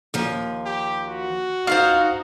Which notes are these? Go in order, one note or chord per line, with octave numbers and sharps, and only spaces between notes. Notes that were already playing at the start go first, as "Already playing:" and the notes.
D#2 F3
G4
F#4
D#4 F4 C5 D#5 F5